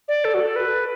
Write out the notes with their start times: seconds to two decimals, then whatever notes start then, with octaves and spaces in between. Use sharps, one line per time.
0.08 D5
0.24 A4
0.34 F#4
0.40 A4
0.56 B4